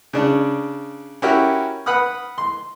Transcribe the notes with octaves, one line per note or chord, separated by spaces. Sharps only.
C#3 D4
C#4 E4 F#4 G4 A#4
B4 F#5 B5 D#6 F6
C6